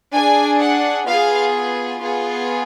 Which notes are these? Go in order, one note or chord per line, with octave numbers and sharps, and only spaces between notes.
D4 G#4 G#5
F#5
B3 F4 G#4 F5
B3 F4 G#4